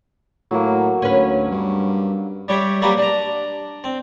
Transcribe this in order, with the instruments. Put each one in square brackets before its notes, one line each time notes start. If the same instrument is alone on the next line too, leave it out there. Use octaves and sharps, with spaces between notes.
[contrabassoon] A2 [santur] F#3 A#3
[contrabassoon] D2 [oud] C#4 B4
[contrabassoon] G2
[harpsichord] G3 G4 C#5 E5
F#3 G3 A#3 F#4 G4 B4
D4 A#5
C4